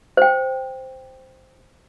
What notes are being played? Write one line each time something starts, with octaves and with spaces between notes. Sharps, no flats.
C5 G5